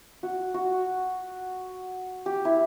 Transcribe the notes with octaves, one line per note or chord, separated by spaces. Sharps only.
F#4
F#4
G4
E4